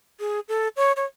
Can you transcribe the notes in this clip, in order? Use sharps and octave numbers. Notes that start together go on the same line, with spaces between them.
G#4
A4
C#5
C#5